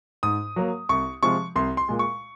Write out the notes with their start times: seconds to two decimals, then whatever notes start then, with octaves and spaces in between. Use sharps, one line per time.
0.23 G#2 D#6
0.56 F#3 A#3
0.89 C2 C#6
1.23 C3 F3 G#3 C#6
1.56 C2 C6
1.77 C6
1.88 A#2 G#3
1.99 C#6